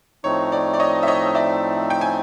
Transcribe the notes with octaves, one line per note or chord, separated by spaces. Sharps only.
A2 F3 A3 C4 D#4 C#5
D5
D5
C#5 D#5
E5
C#5 D#5
D5 E5
G5
G#5